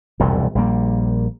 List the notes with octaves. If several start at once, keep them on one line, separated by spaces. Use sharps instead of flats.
E1 C2 F2 A#2
A#1 G3 A#3